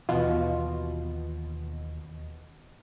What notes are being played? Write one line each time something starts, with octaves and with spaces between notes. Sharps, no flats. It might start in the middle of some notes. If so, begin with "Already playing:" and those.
D#2 B2 E3 F4